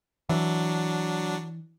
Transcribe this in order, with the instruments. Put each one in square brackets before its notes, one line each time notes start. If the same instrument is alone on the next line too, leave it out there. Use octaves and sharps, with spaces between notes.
[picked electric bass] E3 [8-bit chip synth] F#3 D4